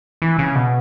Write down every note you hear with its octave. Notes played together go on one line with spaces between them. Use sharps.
E3
C#3
B2